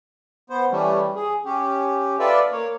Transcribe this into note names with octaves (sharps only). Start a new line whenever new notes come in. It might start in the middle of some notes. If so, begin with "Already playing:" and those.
B3 C5
E3 G3 A3 C#4
G#4
C#4 G4
F4 A4 B4 D5 E5
A#3 C#5